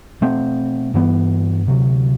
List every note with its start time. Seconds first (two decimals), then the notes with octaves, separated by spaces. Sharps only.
0.21 B2 A3 C4
0.94 G2 E3 B3
1.67 D2 C3 F#3